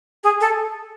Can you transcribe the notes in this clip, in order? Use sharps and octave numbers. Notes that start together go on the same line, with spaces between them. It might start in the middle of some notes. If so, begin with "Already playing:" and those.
G#4
A4